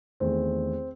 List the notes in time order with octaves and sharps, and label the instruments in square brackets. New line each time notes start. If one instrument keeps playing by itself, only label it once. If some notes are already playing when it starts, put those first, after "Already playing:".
[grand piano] E2 D#3 A3 C4